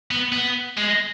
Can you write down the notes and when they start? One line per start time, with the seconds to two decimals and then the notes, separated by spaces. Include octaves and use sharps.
0.11 B3
0.32 B3
0.77 G#3